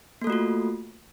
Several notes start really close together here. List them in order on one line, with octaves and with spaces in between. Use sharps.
A#3 A4 A3 F#4 F4